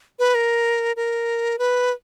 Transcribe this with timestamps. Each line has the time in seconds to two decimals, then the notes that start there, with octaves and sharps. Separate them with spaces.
0.19 B4
0.35 A#4
0.96 A#4
1.59 B4